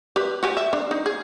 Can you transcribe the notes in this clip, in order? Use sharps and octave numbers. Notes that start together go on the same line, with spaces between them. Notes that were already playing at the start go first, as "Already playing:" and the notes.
G4 B4
F#4 G4 G#5
E5
D4
D#4
G#4